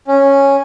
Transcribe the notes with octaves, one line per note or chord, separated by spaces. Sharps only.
C#4